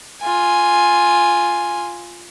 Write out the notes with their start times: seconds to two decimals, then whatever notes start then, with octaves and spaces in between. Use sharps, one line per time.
0.21 F4 G#5